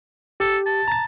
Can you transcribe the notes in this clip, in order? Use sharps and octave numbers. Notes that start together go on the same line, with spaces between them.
G4 A4
A5
A#5 A6